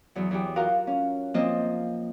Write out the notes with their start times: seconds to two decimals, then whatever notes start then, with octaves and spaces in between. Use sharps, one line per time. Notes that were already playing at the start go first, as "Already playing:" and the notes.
0.15 E2 F#3
0.31 E2 G4
0.56 F4 F#4 A#4 F5
0.87 C#4
1.34 F3 A#3 C4 F4 C5 D#5